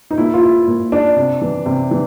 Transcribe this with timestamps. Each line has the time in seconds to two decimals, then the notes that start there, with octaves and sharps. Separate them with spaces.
0.11 D#4
0.18 A#2 E4
0.34 F4
0.43 E4
0.67 A#2
0.92 D4
1.16 C3
1.41 E3
1.66 C3
1.91 E3